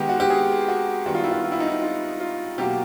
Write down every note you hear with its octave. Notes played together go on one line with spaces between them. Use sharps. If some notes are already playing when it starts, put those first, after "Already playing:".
Already playing: D#3 G#3 B3 G4
F#4
G4
G#4
F#4
D#3 G3 B3 F#4
F4
E4
F4
F4
E4
D#4
E4
F4
F4
B2 F#3 A#3 G4